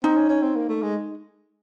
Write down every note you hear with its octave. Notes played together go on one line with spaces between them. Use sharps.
C4 D#4
C#4
C#4
C4
A#3
A3
G#3